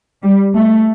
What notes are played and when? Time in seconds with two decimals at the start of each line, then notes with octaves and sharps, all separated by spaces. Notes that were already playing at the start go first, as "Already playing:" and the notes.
0.23 G3
0.55 A3